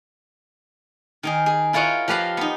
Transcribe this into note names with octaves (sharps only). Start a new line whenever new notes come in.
D#3 D#4 G#4
G#4
E4 F4 A#4 C#5 D#5 F#5
F3 G4 B4 F5 A#5
B3 D#4